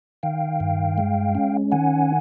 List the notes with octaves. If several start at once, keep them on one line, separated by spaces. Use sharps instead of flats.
D#3 F5 G5
G2
G#3
C#4
D#3 F#5 G#5